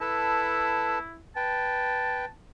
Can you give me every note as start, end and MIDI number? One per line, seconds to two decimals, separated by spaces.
0.01 1.21 64
0.01 0.99 69
0.01 0.99 71
0.01 0.99 81
1.36 2.25 71
1.36 2.25 79
1.36 2.29 81